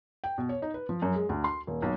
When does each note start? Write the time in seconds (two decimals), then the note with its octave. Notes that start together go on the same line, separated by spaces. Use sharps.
0.24 G5
0.38 B2
0.49 C#5
0.62 D#4
0.74 B4
0.89 F3
1.02 F#2
1.15 G#3
1.29 D2
1.44 C6
1.67 D#1
1.82 B1